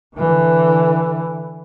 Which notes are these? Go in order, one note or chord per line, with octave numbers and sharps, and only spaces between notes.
D3 E3